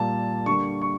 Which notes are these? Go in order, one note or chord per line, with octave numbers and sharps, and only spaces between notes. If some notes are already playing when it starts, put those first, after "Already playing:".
Already playing: A#2 G3 A#3 A5
D3 G3 A#3 C#6
C#6